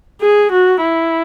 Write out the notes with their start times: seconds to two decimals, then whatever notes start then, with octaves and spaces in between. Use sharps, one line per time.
0.21 G#4
0.52 F#4
0.82 E4